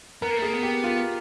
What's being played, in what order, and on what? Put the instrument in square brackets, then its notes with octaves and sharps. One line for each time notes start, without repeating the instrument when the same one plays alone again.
[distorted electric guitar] B3 [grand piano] A#4
[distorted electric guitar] A#3
A3
[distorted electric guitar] A#3 [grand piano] G#4
[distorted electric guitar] B3
[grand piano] G4
F4